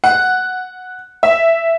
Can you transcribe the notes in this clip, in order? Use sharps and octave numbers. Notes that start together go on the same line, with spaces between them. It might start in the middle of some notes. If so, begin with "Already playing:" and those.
F#5
E5